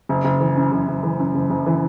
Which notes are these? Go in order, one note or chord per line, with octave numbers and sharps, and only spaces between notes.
F#1
F#1
E3
F#2
F#1
F#1
E3
F#2
F#1
F#1
E3